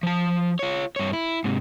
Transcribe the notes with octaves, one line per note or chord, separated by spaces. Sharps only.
F3 A5
F4 C#5
G2 C#5
E4
G#2 C3